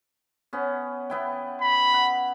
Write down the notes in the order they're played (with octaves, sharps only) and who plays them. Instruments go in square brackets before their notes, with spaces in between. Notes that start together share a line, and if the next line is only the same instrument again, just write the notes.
[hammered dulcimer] B3 C#4
B3 E4 G5
[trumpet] B5
[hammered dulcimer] F#5